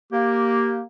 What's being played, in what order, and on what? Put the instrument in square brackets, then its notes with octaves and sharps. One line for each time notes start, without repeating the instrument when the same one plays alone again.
[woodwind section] A#3 [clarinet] G4